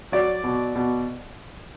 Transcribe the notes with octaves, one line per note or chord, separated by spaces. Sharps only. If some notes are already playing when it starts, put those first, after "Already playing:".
F#3 D5
B2
B2